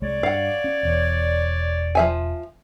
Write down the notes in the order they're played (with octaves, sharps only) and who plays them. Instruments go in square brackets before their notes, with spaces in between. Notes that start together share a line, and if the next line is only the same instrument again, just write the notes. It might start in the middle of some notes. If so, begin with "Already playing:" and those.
[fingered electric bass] C2 G#3 [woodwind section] C#5 D5
[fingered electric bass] G2 [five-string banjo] F5 F#5
[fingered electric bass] C#4
E1 E2
[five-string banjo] F3 E5 G#5